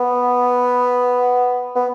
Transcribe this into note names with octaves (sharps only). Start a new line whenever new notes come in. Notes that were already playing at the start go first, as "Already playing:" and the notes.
Already playing: B3
B3